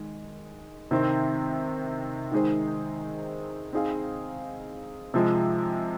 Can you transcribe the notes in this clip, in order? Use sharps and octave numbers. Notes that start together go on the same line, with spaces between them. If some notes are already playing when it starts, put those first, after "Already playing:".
Already playing: D#3 G#3
C3 D#3 C4
D#3 G#3 D#4 G#4 C5
C4 D#4 G#4 F5
C3 F3 G#3